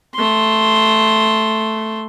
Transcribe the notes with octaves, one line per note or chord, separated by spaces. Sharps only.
A3 C6